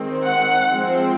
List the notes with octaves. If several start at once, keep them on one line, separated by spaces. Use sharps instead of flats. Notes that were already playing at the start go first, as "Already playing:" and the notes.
Already playing: D#3 G#3 C4
F#5
F3 G#3 C4